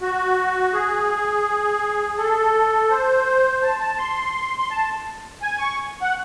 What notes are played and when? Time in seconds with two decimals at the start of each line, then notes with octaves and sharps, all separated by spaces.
0.02 F#4
0.73 G#4
2.17 A4
2.91 C5
3.63 A5
3.80 A5
3.98 C6
4.59 C6
4.71 A5
5.42 G#5
5.59 C#6
6.02 F#5